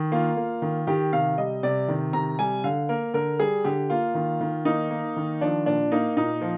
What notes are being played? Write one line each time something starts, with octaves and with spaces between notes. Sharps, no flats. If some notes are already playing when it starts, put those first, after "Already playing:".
Already playing: D#3
A#3 F4
A#3
D#3
D#3 G4
C3 F5
G3 D#5
C3 D5
D#3
C3 A#5
G3 G#5
D3 F5
A#3 A#4
D3 A#4
G3 G#4
D3 G4
A#3 F4
D#3
D#3
A#3 D#4
A#3
D#3
F3 D4
A#2 D4
A#3 D#4
A#2 D#4
F3